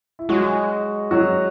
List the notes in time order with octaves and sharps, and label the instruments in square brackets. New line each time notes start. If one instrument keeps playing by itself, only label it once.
[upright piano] E4
[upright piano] F#3 F#4 [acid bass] G#3
[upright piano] F#3 F#4